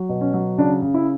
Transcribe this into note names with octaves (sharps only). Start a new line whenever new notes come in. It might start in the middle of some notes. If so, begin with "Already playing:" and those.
Already playing: F#3
B2
C#4
F#3
C#3 D4
C#3
E4